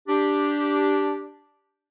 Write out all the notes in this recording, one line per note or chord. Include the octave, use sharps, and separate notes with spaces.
D4 G4